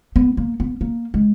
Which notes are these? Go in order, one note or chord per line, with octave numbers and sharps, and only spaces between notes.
B3
A#3
B3
A#3
G#3